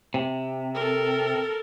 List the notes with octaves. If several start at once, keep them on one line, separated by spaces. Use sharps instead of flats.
C3
A4 A#4